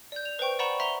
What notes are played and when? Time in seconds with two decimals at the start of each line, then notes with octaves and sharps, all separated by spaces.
0.12 D5 G6
0.25 F7
0.39 B4 C5 G5 C#6
0.59 D5 F#5 A#5 B5 C#6 E7
0.80 E5 A#5 C6 F7 G7